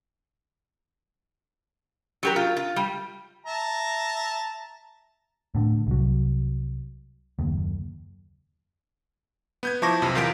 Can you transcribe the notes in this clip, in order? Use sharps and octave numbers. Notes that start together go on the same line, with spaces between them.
F#3 G4 A#4
F4
F4
G3
E5 A5 A#5
A2 D3
C2 F#3
F#1 D#2
B3 G6 G#6
F3 E4 A5 C#6 D6 A#6
B1 F2 C3
E2 F4 A#4 G6 B6 D7